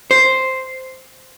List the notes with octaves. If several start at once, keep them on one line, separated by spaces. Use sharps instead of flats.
C5